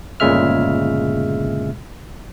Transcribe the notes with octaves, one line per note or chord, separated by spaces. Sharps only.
G1 A#2 C#3 G#3 E5 F6